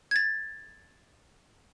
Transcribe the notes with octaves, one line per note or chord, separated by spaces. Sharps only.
G#6 A6